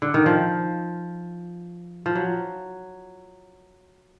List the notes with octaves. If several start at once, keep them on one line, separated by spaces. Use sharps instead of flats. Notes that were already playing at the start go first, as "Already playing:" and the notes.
D3
D#3
F3
F3
F#3